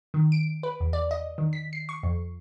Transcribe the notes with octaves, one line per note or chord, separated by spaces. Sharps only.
D#3
D7
B4
E2
D5
D#5
D#3
B6
C7
C#6
F2